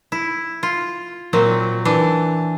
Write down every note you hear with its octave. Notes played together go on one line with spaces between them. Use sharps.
E4
F4
A#2 F#3 C4
E3 D4